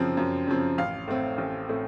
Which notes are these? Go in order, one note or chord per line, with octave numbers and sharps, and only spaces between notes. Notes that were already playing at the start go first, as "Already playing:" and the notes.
Already playing: F#2 C#3 F3 C4
F#2
C#3 F3 C4
A1 F5
A2 A3 C4
A1
A2 A3 C4